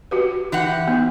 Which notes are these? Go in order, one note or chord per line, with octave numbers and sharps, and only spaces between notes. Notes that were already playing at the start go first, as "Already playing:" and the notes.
F#4 G4 B4
E3 D#4 G4 F#5
B3 D#4